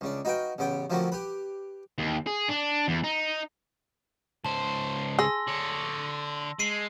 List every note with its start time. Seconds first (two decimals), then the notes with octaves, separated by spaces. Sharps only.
0.01 C#2 C#3 D4
0.25 D#4 F#4 B4 F5 G5
0.58 A1 C#3 B3 G5
0.90 D3 F3 F#3 A3 A#3 C4
1.12 G4 B4
1.98 D#2
2.27 G#4
2.48 D4
2.88 E2
3.04 D#4
4.45 C#2 C5 A5
5.19 G#4 C6 E6 A#6
5.47 D3 C#5
6.59 G#3 C7 D#7